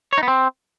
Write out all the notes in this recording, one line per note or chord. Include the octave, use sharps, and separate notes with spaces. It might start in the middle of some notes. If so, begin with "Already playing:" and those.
C#5
D#4
B3
C4